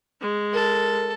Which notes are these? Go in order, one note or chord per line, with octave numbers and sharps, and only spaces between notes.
G#3
A4 A#4